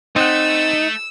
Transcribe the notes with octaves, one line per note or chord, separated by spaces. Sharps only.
A3 C4 D#4 F#5 E6